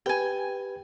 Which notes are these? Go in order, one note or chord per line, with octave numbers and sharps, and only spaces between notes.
G4 B4 G5 G#5